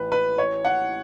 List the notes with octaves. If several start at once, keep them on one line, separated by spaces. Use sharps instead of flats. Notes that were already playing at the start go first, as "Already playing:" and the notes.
Already playing: A1 B4
B4
C#5
F#5